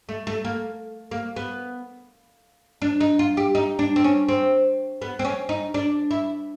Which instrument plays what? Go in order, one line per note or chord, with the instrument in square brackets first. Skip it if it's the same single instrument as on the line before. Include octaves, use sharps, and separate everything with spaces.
[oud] A3
A3
A#3
A#3
B3
D4
D#4
F4
G4
D#4
D4
C4
C#4
C4
B3
C4
C#4
D#4
D4
E4